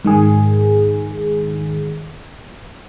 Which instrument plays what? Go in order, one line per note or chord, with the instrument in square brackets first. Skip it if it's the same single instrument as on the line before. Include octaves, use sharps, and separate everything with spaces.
[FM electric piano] G#2 D#3 G#4